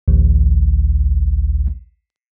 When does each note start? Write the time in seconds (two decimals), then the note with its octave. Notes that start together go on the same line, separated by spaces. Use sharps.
0.08 A1 D2